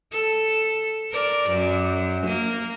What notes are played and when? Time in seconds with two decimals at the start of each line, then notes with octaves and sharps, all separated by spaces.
0.13 A4
1.12 A#4 D5
1.51 F#2
2.27 A#3